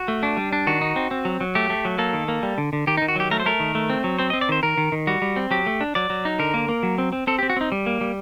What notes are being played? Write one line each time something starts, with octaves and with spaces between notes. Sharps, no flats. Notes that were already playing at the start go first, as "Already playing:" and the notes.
Already playing: F#4
A3
D4
G3
D4
D#3 F#4
D#4
C4
C4
F#3
F#3
A3 G4
A3
F#3
A#3 A4
D#3
A#3
G3
D3
D3
D#3 G4
D#4
D#3
F#4
F#3 G4
A3 A#4
C5
A3 A#4
D#3
A3
C4
F#3
C4 C5
D#5
C4
D5
D#3 C5
D#3 A#4
D#3
D#3
G3 F#4
G3
C4
F#3 G4
A3
D4
F#3 D5
F#3
D#4
D3 A#4
A#3
A#3
F#3
C4
C4
C4 A4
G4
C4
F#4
C4 D#4
G3
A#3
G3